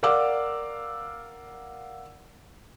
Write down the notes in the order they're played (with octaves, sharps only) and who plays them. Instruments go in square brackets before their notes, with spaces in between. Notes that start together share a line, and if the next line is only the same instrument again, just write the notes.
[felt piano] A#4 D5 F5 F#5 D6 E6